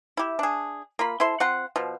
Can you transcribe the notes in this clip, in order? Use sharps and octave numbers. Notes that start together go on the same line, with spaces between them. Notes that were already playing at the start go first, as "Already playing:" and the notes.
E4 G4
D4 G#4
A#3 F4 B5
E4 A4 C5 C6
C4 F4 F#5 C6
B2 F3